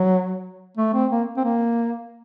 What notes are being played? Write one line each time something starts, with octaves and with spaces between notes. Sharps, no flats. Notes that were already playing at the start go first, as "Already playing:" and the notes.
Already playing: F#3
A3
C4
A#3
C4
A#3